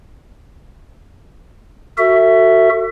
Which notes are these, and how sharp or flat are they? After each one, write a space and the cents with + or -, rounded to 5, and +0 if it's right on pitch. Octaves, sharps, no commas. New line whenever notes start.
F#4 +10 A4 +40 E5 +0